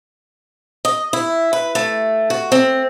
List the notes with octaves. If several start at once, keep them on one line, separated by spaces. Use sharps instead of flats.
D#5
E4
B4
A3
F#4
C4